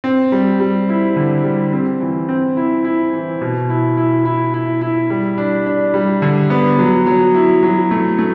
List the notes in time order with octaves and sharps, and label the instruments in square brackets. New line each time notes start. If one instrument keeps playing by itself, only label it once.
[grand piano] C4
G3
G3
E4
D3
G3
C4
E3
C4
E4
E4
E3
B2
E4
E4
E4
E4
E4
G3
D4
D4
G3
D3
B3
F#3
F#3
E4
F#3
A3
A3